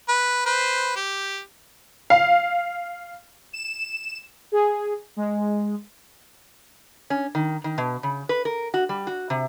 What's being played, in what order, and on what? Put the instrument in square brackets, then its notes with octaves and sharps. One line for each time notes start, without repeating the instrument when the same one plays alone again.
[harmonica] B4
B4 C5
G4
[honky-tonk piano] F5
[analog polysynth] E7
G#4
G#3
[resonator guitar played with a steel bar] C#4
D#3
D#3
B2
C#3
B4
A#4
F#4
G3
F#4
C3